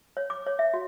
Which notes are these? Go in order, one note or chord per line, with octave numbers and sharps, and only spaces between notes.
C#5
D6
C#5
E5
F#4